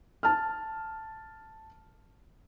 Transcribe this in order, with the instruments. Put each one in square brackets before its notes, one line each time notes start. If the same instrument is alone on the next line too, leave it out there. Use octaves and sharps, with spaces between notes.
[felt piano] A5 F6